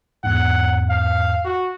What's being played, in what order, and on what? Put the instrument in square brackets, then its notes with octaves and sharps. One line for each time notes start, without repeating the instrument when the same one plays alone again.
[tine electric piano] E2 G#2 [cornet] F#5
[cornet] F5
F#4